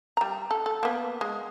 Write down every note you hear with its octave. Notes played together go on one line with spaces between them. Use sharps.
G3 A#5
A4
A4
A#3 B3
G#3